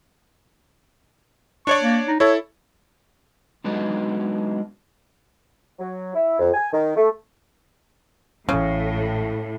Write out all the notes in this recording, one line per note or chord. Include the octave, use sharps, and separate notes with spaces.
D4 C#5 D5 C#6
A#3
D#4
E4 A4 C#5
F#3 G#3 B3 D4 D#4
F#3
E4
F2
G#5
D#3
A3
A1 A2 C#3 C#4